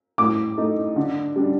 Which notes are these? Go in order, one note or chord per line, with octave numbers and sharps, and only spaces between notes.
A2 D6
A3 D#4
D3
G3 D4